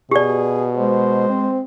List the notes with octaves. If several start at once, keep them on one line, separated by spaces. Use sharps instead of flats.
B2 G4 G#4 D5
G#3 C5
C4